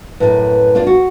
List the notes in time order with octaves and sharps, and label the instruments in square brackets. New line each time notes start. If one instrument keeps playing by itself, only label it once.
[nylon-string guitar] F#2 A2 [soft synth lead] B4
[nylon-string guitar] A#3 D4 F4
F#4